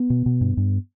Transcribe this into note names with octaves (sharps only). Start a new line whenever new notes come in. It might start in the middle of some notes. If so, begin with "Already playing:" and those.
Already playing: B3
B2
B2
G2
G2